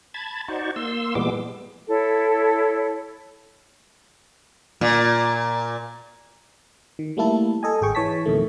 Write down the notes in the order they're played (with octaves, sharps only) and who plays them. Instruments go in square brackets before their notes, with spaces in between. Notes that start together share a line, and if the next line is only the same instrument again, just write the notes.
[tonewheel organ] A5 B5 G#6 A6
D#4 F#4 C5 D5 C#6
A#3 C6 E6
A#2 E3 G3 G#3 B3 D6
[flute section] E4 A4 C#5
[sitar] A#2
[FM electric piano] D#3
G3 A3 A#3 E4 A4
A4 D#5 G#5
G#1 G#4 G5 C#6
E3 C#5 A5 B6
F2 B2 D#3 A3